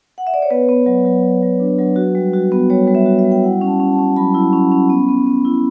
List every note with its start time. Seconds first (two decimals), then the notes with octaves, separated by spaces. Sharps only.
0.18 F#5
0.27 E5
0.34 D5
0.42 C#5
0.50 B3 B4
0.69 B3
0.86 F#3
1.05 F#3
1.23 B3
1.42 F#3
1.60 D4
1.79 F#3
1.96 F#4
2.15 G3
2.33 F#4
2.52 B3
2.70 G3 C#5
2.88 G3
2.95 E5
3.06 F#4
3.19 E5
3.24 G3
3.32 G5
3.44 E4 F#5
3.61 C#4
3.67 A5
3.80 C#4
3.93 A5
3.99 C#4
4.16 F#3 B5
4.35 E4
4.53 C#4
4.72 C#4
4.89 B3
5.09 B3
5.26 B3
5.45 E4